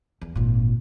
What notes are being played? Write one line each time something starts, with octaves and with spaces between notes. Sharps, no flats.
E2
G#1 A#2